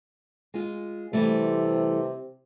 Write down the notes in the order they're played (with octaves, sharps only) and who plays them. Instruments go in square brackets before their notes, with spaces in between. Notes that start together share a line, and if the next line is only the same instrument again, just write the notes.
[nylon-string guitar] G#3 F4
[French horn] C3 [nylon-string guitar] E3 G3 A3